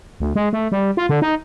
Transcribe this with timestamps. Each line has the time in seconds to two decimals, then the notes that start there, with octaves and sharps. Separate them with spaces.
0.20 D2
0.36 G#3
0.53 A3
0.72 G3
0.97 F4
1.09 D3
1.22 D#4